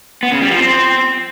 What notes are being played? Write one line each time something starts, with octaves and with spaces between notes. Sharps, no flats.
B3
C#3
G3
F3
C4